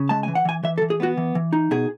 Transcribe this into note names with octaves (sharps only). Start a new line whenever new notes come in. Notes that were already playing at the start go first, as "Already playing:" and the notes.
Already playing: C#3
G#3 A5
E3 G#5
F#5
E3 G#5
E3 E5
A4
E3
G#4
B3 F#4
E3
E3
D#4
B2 G#4